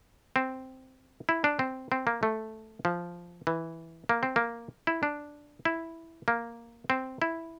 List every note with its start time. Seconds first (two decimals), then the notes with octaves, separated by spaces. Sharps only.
0.36 C4
1.29 E4
1.44 D4
1.59 C4
1.92 C4
2.07 A#3
2.23 A3
2.85 F3
3.47 E3
4.09 A#3
4.23 C4
4.36 A#3
4.87 E4
5.03 D4
5.65 E4
6.28 A#3
6.90 C4
7.22 E4